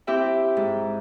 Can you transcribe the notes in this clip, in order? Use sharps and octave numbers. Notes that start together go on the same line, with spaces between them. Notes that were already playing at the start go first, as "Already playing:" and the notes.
C4 E4 G4 E5 G5
G#2